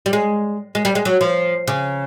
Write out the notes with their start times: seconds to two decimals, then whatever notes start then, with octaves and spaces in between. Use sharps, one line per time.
0.06 G3
0.13 G#3
0.75 G#3
0.85 G3
0.95 G#3
1.05 F#3
1.21 F3
1.68 C#3